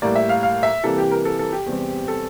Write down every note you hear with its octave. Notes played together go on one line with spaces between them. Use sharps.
A2 G3 A#3 D5
E5
F5
F5
E5
C3 E3 G3 A#3 A4
G4
A#4
A4
A4
G4
E2 C3 G3 C4
A4